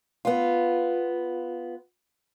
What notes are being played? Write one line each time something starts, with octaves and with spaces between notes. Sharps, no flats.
B3 F4